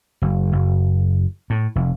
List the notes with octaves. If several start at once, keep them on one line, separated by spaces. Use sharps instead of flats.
F#1
F#1
A2
F1